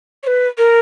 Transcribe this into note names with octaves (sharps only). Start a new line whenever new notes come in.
C#5
B4
A#4